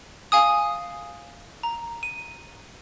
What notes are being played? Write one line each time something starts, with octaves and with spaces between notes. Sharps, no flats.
F5 G#5 D#6
A#5
D#7